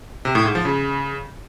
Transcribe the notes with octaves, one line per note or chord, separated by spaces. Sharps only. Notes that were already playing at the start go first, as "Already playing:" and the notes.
C3
A2
G#2
F3
C#3